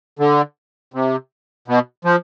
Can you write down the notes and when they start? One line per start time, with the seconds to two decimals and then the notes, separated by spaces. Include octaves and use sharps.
0.19 D3
0.94 C3
1.68 B2
2.05 F3